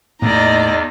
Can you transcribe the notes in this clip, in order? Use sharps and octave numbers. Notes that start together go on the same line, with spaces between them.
E2 A2 A#3 D#4 D5 D#5 A#5